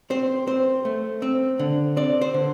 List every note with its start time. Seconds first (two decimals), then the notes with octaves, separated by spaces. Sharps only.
0.10 C4 C5
0.47 C4 C5
0.85 A3
1.22 C4
1.59 D3
1.96 C4 D5
2.21 C5
2.34 D3